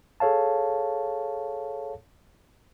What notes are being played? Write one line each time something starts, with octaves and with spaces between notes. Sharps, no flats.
G#4 A4 C#5 F5 A5